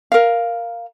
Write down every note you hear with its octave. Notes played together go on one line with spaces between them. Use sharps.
A#4 F5